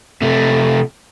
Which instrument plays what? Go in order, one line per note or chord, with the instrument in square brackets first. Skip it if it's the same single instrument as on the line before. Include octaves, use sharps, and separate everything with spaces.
[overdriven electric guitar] C3 A3